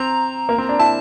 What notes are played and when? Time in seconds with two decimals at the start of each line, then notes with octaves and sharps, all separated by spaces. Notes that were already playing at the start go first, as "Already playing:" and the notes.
Already playing: C4 A#5
0.49 A#3
0.58 C4
0.69 D4
0.79 E4 A5